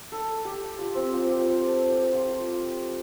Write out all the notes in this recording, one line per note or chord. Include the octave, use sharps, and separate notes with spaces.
A4
G4
F4
C4
F4
G4
C5
A4
G4
F4